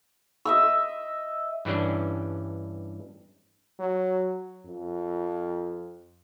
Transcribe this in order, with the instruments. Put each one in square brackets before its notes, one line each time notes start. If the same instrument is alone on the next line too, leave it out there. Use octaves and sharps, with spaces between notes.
[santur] D#5 E5 E6
[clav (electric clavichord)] G2 E3 G3 C#4 D4
[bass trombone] F#3
F2